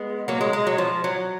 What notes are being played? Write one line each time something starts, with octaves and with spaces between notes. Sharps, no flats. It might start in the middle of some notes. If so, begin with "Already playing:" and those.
Already playing: G#3 B3
F#3 A#3
G#3
G#3
F#3
F3
F#3